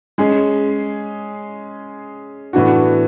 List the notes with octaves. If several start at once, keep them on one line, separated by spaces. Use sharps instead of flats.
G#3 C#4 G#4
A2 E3 B3 D4 F#4